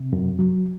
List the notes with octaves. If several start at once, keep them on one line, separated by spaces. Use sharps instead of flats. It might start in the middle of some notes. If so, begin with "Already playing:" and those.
Already playing: C3
F#2
F#3